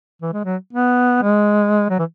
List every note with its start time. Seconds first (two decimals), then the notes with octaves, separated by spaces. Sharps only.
0.22 E3
0.33 G#3
0.45 F#3
0.73 B3
1.23 G#3
1.90 F#3
1.99 E3